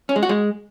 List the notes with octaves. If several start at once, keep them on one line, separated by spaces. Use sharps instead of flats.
C#4
G#3
F#4
G#3